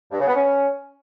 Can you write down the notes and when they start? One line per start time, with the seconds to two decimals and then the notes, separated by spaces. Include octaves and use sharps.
0.11 G2
0.19 C#3
0.27 B3
0.35 C#4